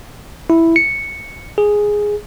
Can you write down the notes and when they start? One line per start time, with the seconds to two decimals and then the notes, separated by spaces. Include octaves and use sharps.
0.50 E4
0.76 C#7
1.58 G#4